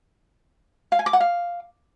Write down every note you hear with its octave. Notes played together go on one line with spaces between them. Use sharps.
F5
G#5
D6
F#5
F5